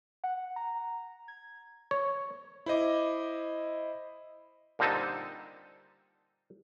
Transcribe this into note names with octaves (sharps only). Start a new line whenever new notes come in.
F#5
A#5
G#6
C#5
E4 C5 D#5 D6
A#2 D3 G3 C4 D#4 A4